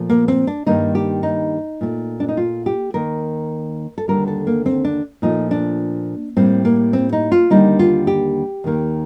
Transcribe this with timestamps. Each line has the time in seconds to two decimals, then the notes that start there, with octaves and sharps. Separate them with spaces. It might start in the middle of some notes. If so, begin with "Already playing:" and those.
Already playing: A#2 F3 A3
0.10 A#3
0.28 C4
0.47 D4
0.66 G2 D#3 G3 A#3 D#4
0.95 G4
1.23 D#4
1.81 A#2 A3
2.20 D4
2.29 D#4
2.37 F4
2.66 G4
2.94 D#2 D#3 A#3 A#4
3.98 A4
4.08 D#2 D3 G3 A#4
4.28 A4
4.47 A#3
4.66 C4
4.85 D4
5.22 A#2 F3 A3 D#4
5.51 D4
6.37 A2 G3 A#3 C4
6.65 A#3
6.93 C4
7.13 D#4
7.32 F4
7.50 D#2 D3 G3 A#3 D#4
7.79 F4
8.07 G4
8.64 D#2 D#3 A#3